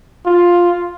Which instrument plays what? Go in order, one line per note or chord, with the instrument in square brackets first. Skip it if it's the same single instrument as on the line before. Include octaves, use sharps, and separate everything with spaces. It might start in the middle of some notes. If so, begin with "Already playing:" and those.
[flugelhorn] F4